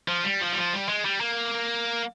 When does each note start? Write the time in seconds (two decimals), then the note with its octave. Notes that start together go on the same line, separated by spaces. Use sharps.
0.08 F3
0.24 G3
0.41 F3
0.53 G3
0.57 F3
0.73 G3
0.89 G#3
1.05 G3
1.21 A#3